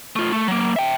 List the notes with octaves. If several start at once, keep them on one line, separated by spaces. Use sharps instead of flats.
A3 F4
A3
F#3 A#3
E5 G5